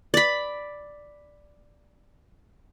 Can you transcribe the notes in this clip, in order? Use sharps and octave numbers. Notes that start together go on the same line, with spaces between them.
D5 B5